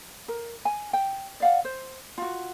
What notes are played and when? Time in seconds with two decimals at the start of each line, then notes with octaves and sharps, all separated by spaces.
0.28 A#4
0.65 G#5
0.93 G5
1.40 D5 F5 F#5
1.65 C5
2.18 F4 F#4